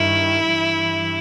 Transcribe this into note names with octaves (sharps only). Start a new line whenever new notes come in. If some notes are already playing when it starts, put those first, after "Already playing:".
Already playing: G2 D#3 E4
G2 E3